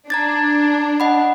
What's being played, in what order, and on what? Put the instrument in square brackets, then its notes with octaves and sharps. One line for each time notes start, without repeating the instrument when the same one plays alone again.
[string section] D4 [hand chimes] A#5 G#6 A6
[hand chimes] D#5 F#5 B5